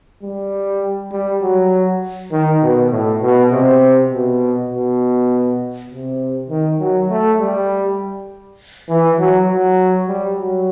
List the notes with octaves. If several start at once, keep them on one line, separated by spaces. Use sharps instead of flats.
G3
G3
F#3
D#3
B2
A2
B2
C3
B2
B2
C3
D#3
F#3
A3
G3
E3
F#3
F#3
G3
F#3